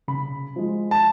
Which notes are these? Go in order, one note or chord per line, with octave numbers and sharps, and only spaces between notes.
C#3 B5
F3 G#3
A5